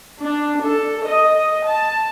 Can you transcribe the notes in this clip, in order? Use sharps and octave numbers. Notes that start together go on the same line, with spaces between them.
D4
A4
D#5
A5